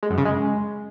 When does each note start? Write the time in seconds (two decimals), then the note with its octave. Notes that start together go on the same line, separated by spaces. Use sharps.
0.03 G#3
0.10 F#2
0.18 C#3
0.25 G#3